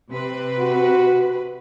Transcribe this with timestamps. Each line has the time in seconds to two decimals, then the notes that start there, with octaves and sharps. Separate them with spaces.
0.11 C3 C4 B4
0.59 F#4